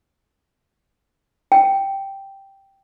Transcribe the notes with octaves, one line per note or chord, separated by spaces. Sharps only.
G5